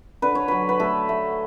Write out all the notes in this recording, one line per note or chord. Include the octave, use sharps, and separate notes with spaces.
D3 B4
C#5
F#3 B4
B4
A3 A4
A3